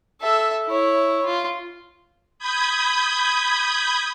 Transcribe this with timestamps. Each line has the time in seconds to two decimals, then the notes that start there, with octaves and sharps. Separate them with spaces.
0.22 A4 E5
0.67 E4 C#5
1.25 F4
2.39 B5 D#6 G6 G#6